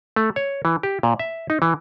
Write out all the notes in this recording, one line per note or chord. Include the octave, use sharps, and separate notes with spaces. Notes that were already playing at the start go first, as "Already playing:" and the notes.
A3
C#5
E3
G4
A#2
E5
D#4
E3